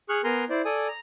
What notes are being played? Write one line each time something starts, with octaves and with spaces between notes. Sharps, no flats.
G#4 C#6 F6 F#6
B3 A#4 G#5 A#5 C6
E4 C5 D5
A4 D5 G#5 D#6
A#5